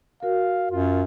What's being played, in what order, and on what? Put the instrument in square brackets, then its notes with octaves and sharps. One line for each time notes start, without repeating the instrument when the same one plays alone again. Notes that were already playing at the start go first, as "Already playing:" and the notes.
[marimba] F#4 A#4 [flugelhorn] F5
[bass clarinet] F#2 [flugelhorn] F4